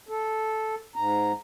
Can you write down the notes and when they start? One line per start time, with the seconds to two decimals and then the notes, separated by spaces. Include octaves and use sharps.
0.09 A4
0.96 G#2 A#5